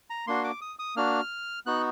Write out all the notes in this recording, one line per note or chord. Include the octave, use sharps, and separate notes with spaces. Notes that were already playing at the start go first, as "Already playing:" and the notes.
A#5
A#3 D4 F#4 C6
D6
D#6
D#6
A#3 D4 F#4 F6
B3 D#4 F#4 F#6